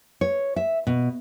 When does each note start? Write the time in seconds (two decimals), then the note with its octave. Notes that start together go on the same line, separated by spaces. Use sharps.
0.21 C#5
0.56 E5
0.87 B2